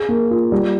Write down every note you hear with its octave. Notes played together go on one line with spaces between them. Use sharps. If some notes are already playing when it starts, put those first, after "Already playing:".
Already playing: G#4
A#3
F4
G3